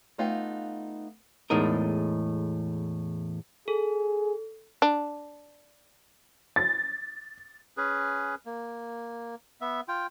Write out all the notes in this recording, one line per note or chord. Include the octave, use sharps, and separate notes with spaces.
A3 B3 D#4 F4 F5 G5
E2 A2 G#3 D#4 A#4
G#4 A4
D4
A6
C#4 G#4 B4
A#3
B3 E5
F4 G5